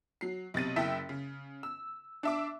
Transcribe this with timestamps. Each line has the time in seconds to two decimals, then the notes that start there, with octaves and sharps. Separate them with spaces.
0.21 F#3 C7
0.54 B1 C3 A6 D#7
0.76 F#1 E4 E5 G5 B6
1.09 C#3
1.63 E6
2.23 D4 E5 D6